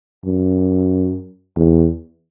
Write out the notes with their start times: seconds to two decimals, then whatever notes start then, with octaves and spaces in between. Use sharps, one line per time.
0.25 F#2
1.57 E2